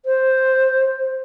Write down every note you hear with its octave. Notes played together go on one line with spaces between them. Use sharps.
C5